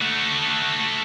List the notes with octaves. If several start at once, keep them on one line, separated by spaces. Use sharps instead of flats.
A3 F#4